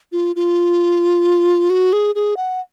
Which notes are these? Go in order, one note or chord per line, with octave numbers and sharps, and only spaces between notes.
F4
F4
F#4
G#4
G#4
F#5